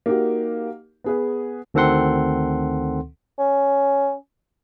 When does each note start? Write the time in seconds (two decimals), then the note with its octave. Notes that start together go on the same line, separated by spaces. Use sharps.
0.06 A#3 D#4 F#4 G4
1.04 B3 G#4 B4
1.74 D2 D#3 C4 A4 F#5 C6
3.39 C#4